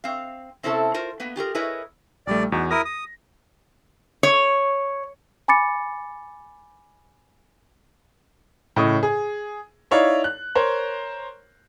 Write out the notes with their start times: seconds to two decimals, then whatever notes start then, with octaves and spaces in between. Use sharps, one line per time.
0.04 C4 F5
0.63 C3 C4 C#4 E4 A4 A5
0.94 F4 A#4 C5
1.20 A#3 B3 B4
1.36 F4 G4 G#4 A#4
1.55 E4 G#4 A#4 B4 C#5 D#5
2.27 A#1 G3 A3 D5
2.52 E2 D#4 F#4
2.71 E4 A#4 D#6 A#6
2.85 D#6
4.23 C#5
5.48 G#5 B5 D6 A6 C#7
8.76 A2 C#3 D#5 C#6 D#6
9.03 G#4
9.91 D#4 E4 C#5 D5 F5
10.24 F#6
10.55 A#4 C5 C#5